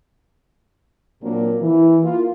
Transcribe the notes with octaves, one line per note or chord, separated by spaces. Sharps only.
A#2 F#3 A#3 C4 D4
E3
A#3 F4